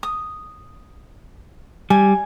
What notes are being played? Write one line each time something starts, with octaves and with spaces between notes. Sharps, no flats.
D#6
G3 G#5